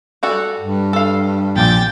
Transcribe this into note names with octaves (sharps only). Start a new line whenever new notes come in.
G3 F#4 A4
G2
A4 F5
A#1 F4 D5 G5 A6